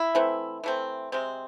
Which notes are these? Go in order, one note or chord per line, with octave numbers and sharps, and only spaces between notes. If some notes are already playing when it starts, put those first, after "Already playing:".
Already playing: E4
E3 A3 C4
E3 A3 C4
C3 G#3 C4